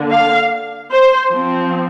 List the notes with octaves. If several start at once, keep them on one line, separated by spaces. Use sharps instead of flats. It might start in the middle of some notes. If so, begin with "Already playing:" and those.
Already playing: D3 A#3 D4
F5
C5
F3 C4